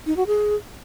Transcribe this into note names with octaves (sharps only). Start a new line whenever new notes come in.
D#4
F#4
G#4